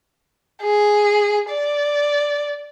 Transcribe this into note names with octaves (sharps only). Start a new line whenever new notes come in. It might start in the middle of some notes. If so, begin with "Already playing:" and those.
G#4
D5